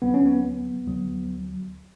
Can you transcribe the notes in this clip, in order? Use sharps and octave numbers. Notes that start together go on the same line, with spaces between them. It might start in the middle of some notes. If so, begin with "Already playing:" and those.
D2 D3 F#3 B3
C#4
B3
B3
D2 D3 F#3